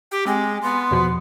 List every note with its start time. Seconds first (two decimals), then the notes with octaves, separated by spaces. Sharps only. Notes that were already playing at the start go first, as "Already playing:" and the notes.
0.11 G4
0.27 G#3 C4
0.63 B3 C6
0.91 E2 B2 F3